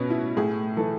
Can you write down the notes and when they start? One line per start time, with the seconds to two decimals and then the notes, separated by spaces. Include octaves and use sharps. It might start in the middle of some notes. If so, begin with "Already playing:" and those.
Already playing: B2 B3 C#4
0.10 E4
0.37 A2 G#4
0.77 E3 A4